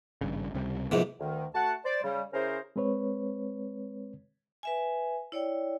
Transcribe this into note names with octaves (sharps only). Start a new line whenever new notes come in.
G#1 G2 C#3
C#2 C3 G3
A#1 G#2 C3 E3 B3
D2 D#3
A3 F#4 F#5 A5
C5 D5
C#3 G3
C#3 C#4 E4 G#4 A#4 C5
G#3 C4 B4 C#5
B4 E5 G#5
E4 C#5 D5 G5